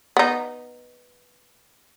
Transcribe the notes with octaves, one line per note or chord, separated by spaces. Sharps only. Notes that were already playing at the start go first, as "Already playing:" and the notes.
B3 D#4